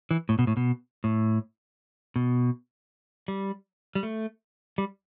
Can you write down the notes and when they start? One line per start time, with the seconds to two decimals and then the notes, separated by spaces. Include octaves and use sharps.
0.11 E3
0.29 A2
0.39 B2
0.47 A2
0.57 B2
1.04 A2
2.16 B2
3.28 G3
3.95 G3
4.03 A3
4.78 G3